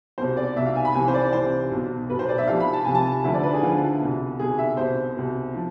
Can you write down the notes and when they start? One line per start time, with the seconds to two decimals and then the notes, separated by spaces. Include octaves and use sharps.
0.18 C2 B2 C5
0.37 D5
0.56 C2 B2 E5
0.66 F5
0.76 G#5
0.85 B5
0.94 C2 C3 E3 G#5
1.08 C5
1.14 D5
1.32 C2 C3 E3 C5
1.71 B1 B2
2.09 B1 B2 B4
2.19 C5
2.29 D5
2.38 E5
2.48 C2 C3 F3 F5
2.60 B5
2.73 A5
2.84 C2 C3 F3 G#5
2.95 A5
3.24 D2 D3 F3 E5
3.34 D5
3.43 B4
3.53 G#4
3.63 D2 D3 F3 F4
4.01 C2 B2
4.39 C2 B2 G#4
4.58 E5
4.77 C2 B2 C5
5.16 C2 B2
5.54 F3